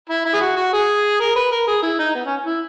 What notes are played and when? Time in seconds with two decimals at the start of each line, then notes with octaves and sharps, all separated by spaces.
0.10 E4
0.26 E4
0.34 G#4
0.41 F#4
0.56 F#4
0.73 G#4
1.20 A#4
1.36 B4
1.51 A#4
1.67 G#4
1.83 E4
1.99 D#4
2.15 B3
2.26 C#4
2.46 E4